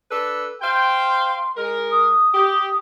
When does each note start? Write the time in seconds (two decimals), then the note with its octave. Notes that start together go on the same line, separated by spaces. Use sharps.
0.11 D4 A4 B4
0.62 C5 F5 G5 C6
1.56 G#3 A#4
1.91 D#6
2.34 G4